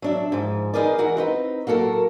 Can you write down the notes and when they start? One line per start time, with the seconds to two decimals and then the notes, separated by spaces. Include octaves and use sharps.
0.02 F#3 D4 E5
0.32 G#2 F3
0.74 D#4 F4 G#4 A#4 B4 D5
0.98 E3 F#4 A#4
1.17 C4 D#4 B4
1.67 F#3 A#3 F#4 A4 A#4